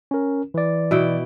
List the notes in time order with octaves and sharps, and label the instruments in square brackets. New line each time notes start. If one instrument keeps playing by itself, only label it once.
[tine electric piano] C#4 A#4
E3 D5
[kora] B2 E4 G5